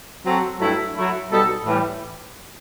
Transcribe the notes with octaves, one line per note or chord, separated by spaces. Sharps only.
F#3 C4 F#4 A4
G2 F#3 A3 E4 A4
F#3 A3 E4
B2 G3 D#4 A4
A2 E3 G3